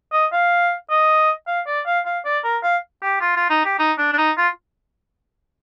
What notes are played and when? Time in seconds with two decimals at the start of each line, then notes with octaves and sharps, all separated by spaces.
0.12 D#5
0.32 F5
0.90 D#5
1.47 F5
1.67 D5
1.86 F5
2.06 F5
2.25 D5
2.44 A#4
2.63 F5
3.03 G4
3.21 F4
3.36 F4
3.50 D#4
3.65 G4
3.79 D#4
3.98 D4
4.13 D4
4.18 D#4
4.38 F4